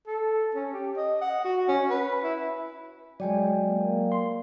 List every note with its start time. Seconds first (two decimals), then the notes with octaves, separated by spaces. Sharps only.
0.07 A4
0.55 C#4
0.73 G4
0.97 D#5
1.21 F#5
1.44 F#4
1.68 C#4
1.90 B4
2.23 E4
3.20 F#3 G#3 D5 G5 G#5
3.68 A#3
4.12 C6